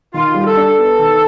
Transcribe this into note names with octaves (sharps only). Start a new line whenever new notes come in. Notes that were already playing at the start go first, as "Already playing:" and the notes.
D#3 F4
G3
A4
D4
B3
D#3